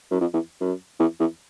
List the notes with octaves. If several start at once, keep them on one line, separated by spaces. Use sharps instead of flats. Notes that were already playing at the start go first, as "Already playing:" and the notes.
F#2
F2
E2
F#2
E2
E2